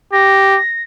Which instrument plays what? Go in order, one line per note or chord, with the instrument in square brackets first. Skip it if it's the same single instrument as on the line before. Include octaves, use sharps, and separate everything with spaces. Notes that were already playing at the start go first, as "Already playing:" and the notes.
[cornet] G4 [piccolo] A#6